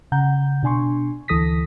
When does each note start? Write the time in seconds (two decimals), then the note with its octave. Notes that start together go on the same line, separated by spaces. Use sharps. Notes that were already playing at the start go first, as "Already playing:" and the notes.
0.12 C#3 F#5 A#5 G6
0.63 B2 D4 G#5 C6 C#6
1.28 D2 E3 A4 D#6 A#6 B6